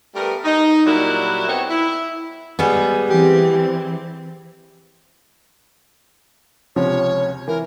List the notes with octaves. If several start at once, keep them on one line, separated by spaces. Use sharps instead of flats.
G3 A3 B3 A#4
D#4
A#2 F#3 G3 E4 F#4 A#4
B3 C4 D#4 G4 C#5
E4
G3 G#3 B3 G#4
E3 C4 G4
C#2 C3 F3 C#5
E3 A#4